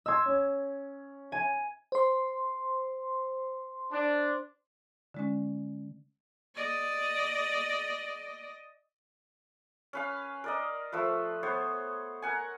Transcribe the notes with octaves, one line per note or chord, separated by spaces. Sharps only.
D#5 C6 E6 G#6
C#4
G#5
C5 C6
D4
D3 G#3 C#4
D5 D#5
C#4 B4 F5
A#4 D5 D#5
F3 A3 B4
B3 C5 C#5
A#4 F#5 G#5